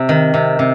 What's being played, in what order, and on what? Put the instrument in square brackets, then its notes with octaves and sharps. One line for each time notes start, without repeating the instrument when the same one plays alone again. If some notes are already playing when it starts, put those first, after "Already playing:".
Already playing: [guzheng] C3 G3
D#3
C3
C3